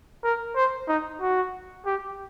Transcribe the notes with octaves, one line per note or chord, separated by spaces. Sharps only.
A#4
C5
D#4
F#4
G4